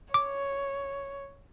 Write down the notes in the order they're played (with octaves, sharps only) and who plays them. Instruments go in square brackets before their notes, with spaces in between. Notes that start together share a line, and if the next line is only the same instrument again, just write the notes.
[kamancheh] C#5 [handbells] D6